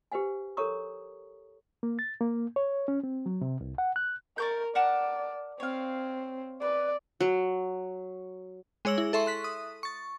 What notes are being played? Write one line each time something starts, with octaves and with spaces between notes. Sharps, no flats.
G4 B4 C5 F#5 G#5
A4 A#4 C#5 A#5 C#6 D#6
A#3
A6
A#3
C#5
C#4
C4
F#3
C3
C2
F#5
F#6
A#4 D5 C#6 G6
A#4 D5 F#5 A5
C4 C#5 F5
B4 D5
F#3
G#3 G#4 C#5 E6 F#7
E4
A4 E5 C6 C#6
C6 F#6 B6
D#6
C#6 A6